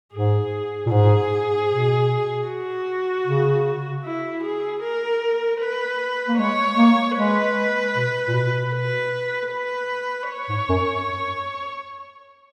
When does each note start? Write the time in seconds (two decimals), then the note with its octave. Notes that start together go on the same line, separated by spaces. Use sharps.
0.13 G#2 G#4
0.86 A#2
0.91 G#2 G#4
1.70 B2
2.47 F#4
3.26 C#3
4.05 E4
4.43 G#4
4.82 A#4
5.61 B4
6.28 A#3
6.39 G#3 C#5
6.78 A#3
7.17 G#3 B4
7.96 B2
8.28 A#2
8.34 B2
8.73 B4
9.51 B4
10.30 C#5
10.49 G#2
10.69 F#2